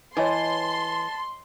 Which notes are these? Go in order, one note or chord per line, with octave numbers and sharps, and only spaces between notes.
E3 C#5 D#5 A5 C6 C#6